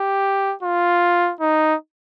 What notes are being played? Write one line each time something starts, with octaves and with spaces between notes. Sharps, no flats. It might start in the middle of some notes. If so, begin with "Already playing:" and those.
Already playing: G4
F4
D#4